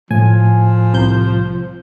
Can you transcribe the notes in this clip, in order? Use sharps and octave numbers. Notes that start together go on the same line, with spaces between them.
A2 F3 G#5
C2 C5 G6